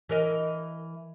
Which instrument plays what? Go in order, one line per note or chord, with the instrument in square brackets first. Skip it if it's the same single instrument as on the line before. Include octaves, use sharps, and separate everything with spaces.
[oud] E3 A#4 D#5